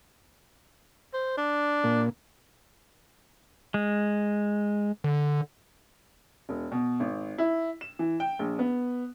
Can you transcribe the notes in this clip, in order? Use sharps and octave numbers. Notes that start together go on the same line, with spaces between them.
C5
D4
A#2
G#3
D3
E1
B2
G#1
E4
E7
E3
G5
A#1
B3